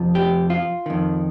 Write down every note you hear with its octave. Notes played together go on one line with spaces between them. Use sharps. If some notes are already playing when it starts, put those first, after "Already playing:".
Already playing: F2 C3 F3
G4
F4
F2 D#3